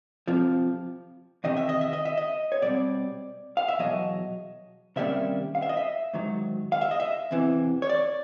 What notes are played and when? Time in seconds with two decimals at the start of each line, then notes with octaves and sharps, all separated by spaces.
0.27 F2 C3 F3
1.44 E2 C3 D#3 D#5
1.57 E5
1.69 D#5
1.81 E5
1.93 D#5
2.05 E5
2.17 D#5
2.52 C#5
2.62 B2 G3 C4 D5
3.57 F5
3.68 E5
3.79 E2 B2 F#3 D#5
4.96 C3 D#3 G3 A#3 C#4 E5
5.55 F5
5.62 E5
5.69 D#5
5.77 E5
6.13 G#2 D#3 F#3
6.72 F5
6.81 E5
6.91 D#5
7.00 E5
7.31 E2 C3 E3
7.82 C#5
7.89 D5